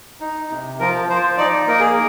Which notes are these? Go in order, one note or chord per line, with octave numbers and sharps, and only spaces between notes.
D#4
C3
F3 A#4
F3 C5
D#4 D5
A#3 A#4
G#4
A#4